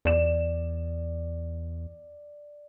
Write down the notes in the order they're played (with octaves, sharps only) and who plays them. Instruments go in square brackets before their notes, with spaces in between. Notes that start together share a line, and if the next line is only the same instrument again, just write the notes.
[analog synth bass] E2 [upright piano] D5 E7